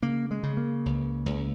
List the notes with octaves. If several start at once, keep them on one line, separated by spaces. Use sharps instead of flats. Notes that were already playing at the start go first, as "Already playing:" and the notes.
C#3 A#3
G#3
C#3
A#3
C#2
C#2